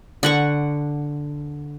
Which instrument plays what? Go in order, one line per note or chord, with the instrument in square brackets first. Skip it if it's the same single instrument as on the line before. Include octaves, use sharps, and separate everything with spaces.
[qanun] D3 F#5 C#6